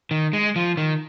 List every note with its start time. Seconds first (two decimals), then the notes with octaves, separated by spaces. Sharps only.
0.11 D#3
0.33 G#3
0.56 F3
0.77 D#3